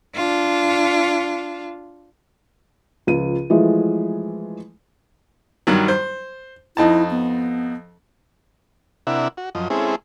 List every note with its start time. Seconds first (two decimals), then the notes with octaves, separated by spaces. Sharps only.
0.15 D4 F4
3.07 C#2 F3 D#7
3.50 E3 F3 G#3 A3
5.67 G2 D#3 F#3
5.88 C5
6.77 F2 D#4 E4 A5
7.11 B3
9.07 C3 D4 E4 A#4 E5 F#5
9.37 F#4
9.55 F#2 F3 D#5
9.70 G#3 C4 C#4 E4 G#4 A4